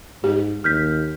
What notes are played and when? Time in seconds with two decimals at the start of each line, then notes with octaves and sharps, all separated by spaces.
0.24 G#2 G4
0.64 D#2 F6 G6 B6